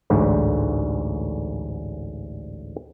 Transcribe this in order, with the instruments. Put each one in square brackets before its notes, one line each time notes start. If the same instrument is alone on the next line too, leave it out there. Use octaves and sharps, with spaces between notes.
[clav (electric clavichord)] A1 D2 G#2 D3